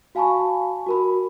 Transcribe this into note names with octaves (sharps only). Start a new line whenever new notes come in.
F#4 F5 G#5 A5 B5 C#6
F#4 A#4 B5